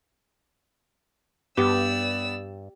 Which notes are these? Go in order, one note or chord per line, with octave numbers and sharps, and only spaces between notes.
G2 B3 G4 D5 E6